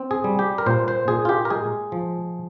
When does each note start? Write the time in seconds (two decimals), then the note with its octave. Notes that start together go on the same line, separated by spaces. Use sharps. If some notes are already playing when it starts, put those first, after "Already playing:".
Already playing: C4
0.11 G#4
0.24 G3
0.39 G4
0.58 A#4
0.66 A#2 C5
0.88 C5
1.08 A#2 G#4
1.25 F4
1.29 G4
1.45 A#4
1.50 G#3 G#4
1.92 F3